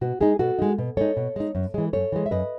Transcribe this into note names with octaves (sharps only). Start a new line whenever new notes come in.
B2 F#4
G#3 D#4 G#4
B2 F#4 A4
G#3 D#4
B2
G#3 D#4 A4 C#5
B2
G#3 D#4
F#2
E3 G#3
F#2 A4 C#5
E3 G#3
E5
F#2 B4 D#5